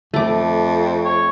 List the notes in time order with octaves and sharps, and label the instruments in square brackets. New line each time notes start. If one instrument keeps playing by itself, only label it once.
[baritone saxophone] F2 [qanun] A3 D6
[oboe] C#5